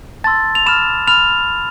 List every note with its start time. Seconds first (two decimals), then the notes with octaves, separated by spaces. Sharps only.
0.24 A5 C6 E6 A6
0.55 F7
0.66 B5 D6 F6 E7
1.07 B5 F6 F7